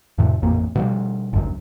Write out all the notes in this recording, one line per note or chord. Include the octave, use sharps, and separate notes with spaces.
F2 A2 C3 F3
A1 F2 A#2 A#3
B2 F3 G3
G1 C#2 F#2 F#3